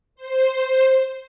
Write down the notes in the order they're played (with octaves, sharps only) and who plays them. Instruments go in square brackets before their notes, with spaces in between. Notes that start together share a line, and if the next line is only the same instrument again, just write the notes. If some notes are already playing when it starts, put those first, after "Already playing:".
[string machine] C5